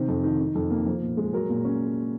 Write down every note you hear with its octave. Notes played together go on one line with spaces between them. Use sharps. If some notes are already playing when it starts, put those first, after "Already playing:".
Already playing: C3 D#3 C5
F2
D#3
D#3
F2
A#3
F3
A#2
G#3
F#3 A#4
A#2
C#4